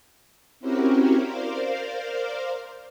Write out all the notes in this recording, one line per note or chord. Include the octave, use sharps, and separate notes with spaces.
C4 C#4 E4 F#4 G4 A#4
A#4 C5 D5 F5